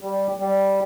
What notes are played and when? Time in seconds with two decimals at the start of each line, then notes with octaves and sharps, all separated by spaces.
0.01 G3
0.40 G3